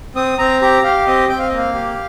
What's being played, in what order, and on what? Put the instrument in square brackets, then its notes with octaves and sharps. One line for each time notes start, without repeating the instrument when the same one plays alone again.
[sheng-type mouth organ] C4 D#6
C4 A#5
G4 A#5
G4 F5
C4 D#5
C4 G5
F5
A#3 D#5
F5
G4